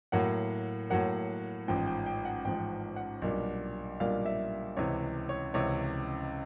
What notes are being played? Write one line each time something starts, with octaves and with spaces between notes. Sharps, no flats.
A2 F#3 A#3 F#5
A2 F#3 A#3 F#5
A1 G#2 F3 G5
G5
G5
F#5
A1 G#2 F3 G5
F#5
B1 A#2 G3 A#3 D4
B1 A#2 G3 A#3 D4 F5
E5
C#2 C3 E3 C#5
C#5
C#2 C3 E3 C#5